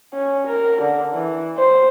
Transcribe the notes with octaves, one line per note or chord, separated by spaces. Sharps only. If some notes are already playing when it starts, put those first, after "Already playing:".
C#4
A#4
D3
E3
C5